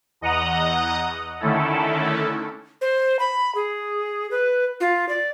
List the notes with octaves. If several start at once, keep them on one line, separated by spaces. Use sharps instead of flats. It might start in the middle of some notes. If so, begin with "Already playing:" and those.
E2 D#5 F#5 A#5 D#6
D3 D#3 A3 C#4 E4 A4
C5
B5
G#4
B4
F4
D5